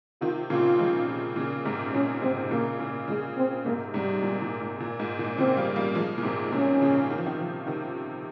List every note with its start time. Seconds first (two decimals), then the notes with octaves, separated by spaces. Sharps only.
0.21 C3 D#3 F4
0.50 A#2 C#3 F4
0.79 F3 G#3
1.36 A#2 C#3
1.65 G#2 C3
1.94 A#2 C#4
2.22 G#2 C3 C4
2.51 A#2 C#3 A#3
2.79 A#2 C#3
3.08 A#2 C#3 G#3
3.37 C4
3.65 G#2 C3 A#3
3.94 G#2 C3 G3
4.23 A#2
4.42 A#2
4.61 G#2
4.80 A#2
4.99 G#2
5.19 A#2
5.37 A#2 C#3 C4
5.57 G3 A#3
5.76 G3 A#3
5.95 F3 G#3
6.18 A#2
6.23 G#2 C3
6.52 A#2 C#4
6.81 A#2 C#3
7.10 D#3
7.18 F3
7.25 C3 D#3
7.38 C#3 F3
7.67 C3 D#3